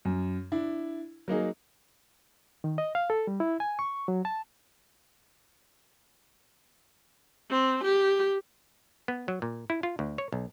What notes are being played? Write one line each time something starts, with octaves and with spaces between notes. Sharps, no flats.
F#2
D4 E4
F#3 A#3 D#4 G#4
D#3
D#5
F5
A4
G3
E4
G#5
C#6
F#3
A5
C4
G4
B3
F#3
A#2
E4
F4
D2
C#5
B1